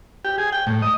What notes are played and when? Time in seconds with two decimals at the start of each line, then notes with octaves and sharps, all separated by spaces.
0.25 G4
0.38 G#4
0.52 G5
0.67 A2
0.82 D#5